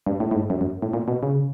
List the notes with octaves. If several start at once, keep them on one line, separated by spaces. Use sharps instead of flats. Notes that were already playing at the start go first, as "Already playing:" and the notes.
G2
A2
A2
G#2
F#2
F#2
A2
A#2
B2
C#3